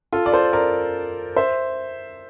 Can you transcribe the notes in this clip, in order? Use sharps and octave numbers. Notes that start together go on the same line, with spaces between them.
F4 A4
D5
A4 C5
A#4 D5
C5 E5